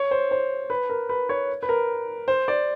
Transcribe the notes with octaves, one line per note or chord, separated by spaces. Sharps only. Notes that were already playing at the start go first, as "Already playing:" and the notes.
Already playing: C#5
C5
C5
B4
A#4
B4
C#5
B4
A#4
C5
D5